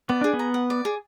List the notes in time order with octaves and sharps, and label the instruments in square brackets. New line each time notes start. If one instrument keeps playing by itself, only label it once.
[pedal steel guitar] B3 [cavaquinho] D5
[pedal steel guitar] D4 [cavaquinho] G#4
[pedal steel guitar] B3
[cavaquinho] A#5
F#5
D5
G#4